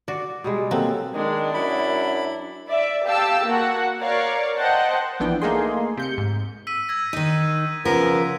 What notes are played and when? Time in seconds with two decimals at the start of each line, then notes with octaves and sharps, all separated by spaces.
0.08 F#4 D5
0.44 B2 G3 G#3
0.71 F#3 A#3 C4 A4
1.15 D#3 G#3 D4
1.54 F#2 E4 B5
2.69 D5 E5
3.07 G4 F5 A5 E6
3.45 A#3 F#4 F#5
4.01 A#4 C#5 D5 F5
4.57 C5 D#5 F#5 G5 A5
5.20 A#1 E3 F3 B3 D4 G5
5.42 A3 A#3 D#4 G#4 C6
5.97 C3 G6 C#7
6.18 G#2
6.67 E6 B6 D#7
6.89 E6 G#6 A#6
7.13 D#3 D#4 D#7
7.85 C#3 F3 B3 A#4